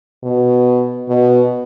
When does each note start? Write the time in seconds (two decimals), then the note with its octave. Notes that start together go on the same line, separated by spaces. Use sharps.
0.23 B2
1.09 B2